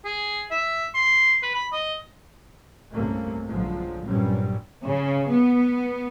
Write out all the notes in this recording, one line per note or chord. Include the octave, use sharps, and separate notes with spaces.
G#4
E5
C6
B4
B5
D#5
C2 G2 C3 A3 A#3 C#4
B1 D3 F3 F#3 G#3
G2 A#2 F#3 G3 C4 C#4
C#3
B3